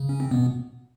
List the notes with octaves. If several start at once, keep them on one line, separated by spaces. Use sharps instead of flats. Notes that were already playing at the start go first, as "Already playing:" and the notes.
Already playing: C#3
C#4
C4
B2 B3